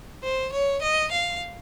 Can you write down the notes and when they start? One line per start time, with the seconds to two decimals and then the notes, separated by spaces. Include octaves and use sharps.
0.23 C5
0.53 C#5
0.82 D#5
1.11 F5